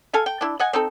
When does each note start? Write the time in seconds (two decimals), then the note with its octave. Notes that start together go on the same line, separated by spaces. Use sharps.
0.13 A4 F5 G#5
0.26 G5
0.41 D4 E4
0.59 D#5 F#5 G#5
0.73 C4 D#4 A4